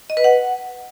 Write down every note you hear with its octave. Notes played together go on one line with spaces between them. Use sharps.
D#5
B4
F#5